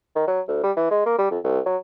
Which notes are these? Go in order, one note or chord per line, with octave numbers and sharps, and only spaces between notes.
D#3
F#3
D2
G3
E3
G#3
A#3
G3
F2
C2
F#3